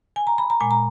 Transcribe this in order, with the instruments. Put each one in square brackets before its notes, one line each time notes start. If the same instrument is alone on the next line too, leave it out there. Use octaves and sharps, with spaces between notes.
[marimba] G#5
A#5
B5
A#5
A#2 G#3 G#5
A#5